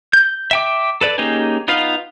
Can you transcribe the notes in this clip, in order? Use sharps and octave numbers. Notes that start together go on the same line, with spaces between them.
G6
E5 G5 D6
A4 B4 D5
A#3 C#4 D#4 G4 G#4
B3 D#4 F4 B4 F5